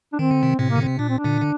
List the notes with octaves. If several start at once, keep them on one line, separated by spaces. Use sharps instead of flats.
D4
D#3 C4
D3
C3 D#3
A2 C3 C4
A#3
D3
C4
C3
A#2 D4
C4
D4
A#2 D3
D3